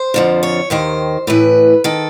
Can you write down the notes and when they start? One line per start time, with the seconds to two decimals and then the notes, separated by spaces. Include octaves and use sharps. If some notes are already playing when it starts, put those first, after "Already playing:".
Already playing: C5
0.14 F2 D3 F3
0.43 C#5
0.70 D#2 D#3 C5
1.27 A2 E3 B4
1.84 D#3 A4